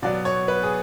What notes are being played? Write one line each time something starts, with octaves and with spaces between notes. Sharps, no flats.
B2 F#3 B3 D5
C#5
B4
G#4